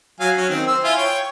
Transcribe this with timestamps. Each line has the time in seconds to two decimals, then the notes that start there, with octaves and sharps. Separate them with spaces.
0.20 F#3 F5 G#5
0.37 F#3 C#4
0.49 D#3 C4
0.67 C5 E6
0.84 E4 F4 G#5
0.97 C#5 G5